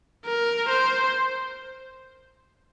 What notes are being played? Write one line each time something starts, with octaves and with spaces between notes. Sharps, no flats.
A#4
C5